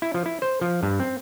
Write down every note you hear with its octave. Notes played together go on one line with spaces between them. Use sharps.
E4
F3
E4
C5
F3
G2
C4